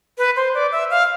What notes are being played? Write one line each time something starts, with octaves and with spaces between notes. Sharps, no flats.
B4
C5
D5
E5
F5